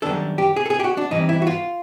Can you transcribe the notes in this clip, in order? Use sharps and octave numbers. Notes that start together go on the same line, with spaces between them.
F#2 D#3 G3 B3 D4 A4
G4
G#4
A4
G#4
G4
F#4
D4
G2 E3 G3 C4 D#4
E4
F#4
F4